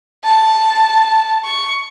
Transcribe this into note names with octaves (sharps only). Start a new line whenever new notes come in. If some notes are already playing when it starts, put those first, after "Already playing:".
A5
C#6